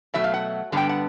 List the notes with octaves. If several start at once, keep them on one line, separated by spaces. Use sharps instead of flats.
B2 F#3 A3 E5
F5
F#5
G2 D3 G3 B3 G5
F#5